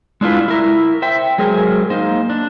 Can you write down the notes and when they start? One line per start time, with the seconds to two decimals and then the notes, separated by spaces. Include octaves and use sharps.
0.21 G#3 D4 E4 F4 B4
0.48 E4 A#4
1.02 C5 E5 G5
1.38 F#3 G#3 G#4 A#4 C5
1.90 A#3 D#4 C5
2.30 D4